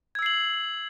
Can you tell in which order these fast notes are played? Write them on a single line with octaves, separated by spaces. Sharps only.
G#6 E6 C7 F#7